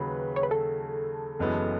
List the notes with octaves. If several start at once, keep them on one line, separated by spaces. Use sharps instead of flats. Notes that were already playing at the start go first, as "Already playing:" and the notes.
Already playing: D#2 C#3 F#3 B4
C#5
B4
A4
F#1 F#2 E3 G#3 B3